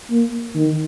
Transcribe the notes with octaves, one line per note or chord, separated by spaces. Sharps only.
A#3
D#3